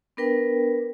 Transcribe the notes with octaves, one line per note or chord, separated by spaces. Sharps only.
B3 D4 A#4 B4 G5